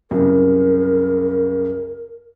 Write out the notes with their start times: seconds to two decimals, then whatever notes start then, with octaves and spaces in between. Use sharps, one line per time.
0.11 C2 F#2 C#3 A#4